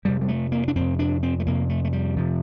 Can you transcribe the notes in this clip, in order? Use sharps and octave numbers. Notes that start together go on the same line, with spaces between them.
F2 C3 G3
G3
A3
A#3
D4
F2 C3 C4
D4
C4
A3
F2 C3 A#3
A3
A3
G3
F2 C3 F3